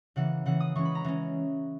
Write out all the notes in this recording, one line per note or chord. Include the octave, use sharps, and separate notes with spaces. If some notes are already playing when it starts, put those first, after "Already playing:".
C#3 E3 A#3 F#5
C#3 E3 A#3 F#5
D#6
E3 G#3 C#4 C#6
B5
A#5
E3 G#3 C#4